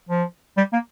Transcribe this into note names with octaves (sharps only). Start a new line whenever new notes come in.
F3
G3
A#3